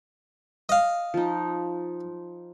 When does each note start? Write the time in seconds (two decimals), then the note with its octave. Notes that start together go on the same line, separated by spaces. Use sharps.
0.69 D#5 F5
1.14 F3 D#4